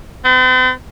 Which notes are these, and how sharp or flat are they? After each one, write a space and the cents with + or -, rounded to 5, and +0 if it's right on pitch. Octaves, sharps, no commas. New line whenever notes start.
C4 -45